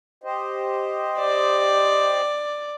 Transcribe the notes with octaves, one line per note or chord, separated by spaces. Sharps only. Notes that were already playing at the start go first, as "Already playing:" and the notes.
G4 C5 D#5
D5